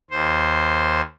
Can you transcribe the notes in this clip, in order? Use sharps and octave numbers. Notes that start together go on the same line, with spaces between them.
D#2 C5